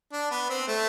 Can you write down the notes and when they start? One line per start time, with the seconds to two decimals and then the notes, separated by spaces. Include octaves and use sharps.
0.13 D4
0.31 B3
0.50 C4
0.68 A3